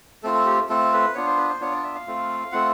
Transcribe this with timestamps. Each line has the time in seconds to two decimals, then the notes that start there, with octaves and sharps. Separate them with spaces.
0.23 A3 C4 F4 A4
0.34 A4
0.46 G4
0.69 A3 C4 F4 A4
0.93 B4
1.15 B3 D4 F4 C#5
1.27 C5
1.38 B4
1.49 C5
1.60 B3 D4 F4 C#5
1.72 D5
1.84 E5
1.95 F5
2.07 A3 C4 F4
2.52 A3 C4 F4 F#5